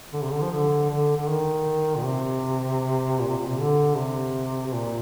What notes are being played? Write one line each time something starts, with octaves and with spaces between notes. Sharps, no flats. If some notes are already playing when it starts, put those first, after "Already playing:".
D3
C3
D3
F3
D3
D3
D3
D#3
A#2
C3
A#2
C3
A#2
C3
D3
C3
C3
A#2